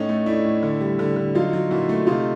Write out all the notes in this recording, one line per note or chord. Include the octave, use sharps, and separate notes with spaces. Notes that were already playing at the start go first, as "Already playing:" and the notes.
Already playing: A2 C#4 D#4
A3
A2 D4 E4
A2
D3
G3
D3
D3
F#3 D#4 F4
F#3
A#2 E4 F#4
A3
C3 D#4 F4